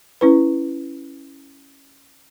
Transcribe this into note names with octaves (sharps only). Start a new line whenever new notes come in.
C#4 E4 B4